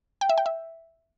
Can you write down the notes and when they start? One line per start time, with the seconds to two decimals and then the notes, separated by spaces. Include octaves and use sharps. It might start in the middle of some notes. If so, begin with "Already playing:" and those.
0.21 G5
0.29 E5
0.38 G5
0.46 E5